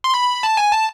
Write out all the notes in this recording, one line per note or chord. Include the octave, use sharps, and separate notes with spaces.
C6
B5
A5
G#5
A5